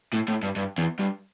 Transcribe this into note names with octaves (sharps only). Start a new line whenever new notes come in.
A2
A2
G2
G2
E2
G2